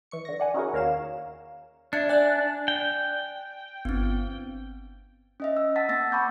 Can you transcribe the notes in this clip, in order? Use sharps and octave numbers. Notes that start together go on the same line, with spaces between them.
E3 C#6 C#7
D3 A#6
D5 F#5 G#5
C#4 D#4 E4 F#4 G#4 A#4
D#2 A#4 C#5 F5 E7
D4 E5 G#6 C#7
D5 G#5 F#6
G5
G1 B3 C4
C#4 D#5 E5
E6
F#5 A5 E6 A6 B6
A#3 C4 E6 A6 A#6
F#5 A5 B5 C#6 D6 G6